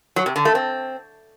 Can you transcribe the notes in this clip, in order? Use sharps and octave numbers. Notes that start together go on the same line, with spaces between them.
F#3
C3
D3
A3
C4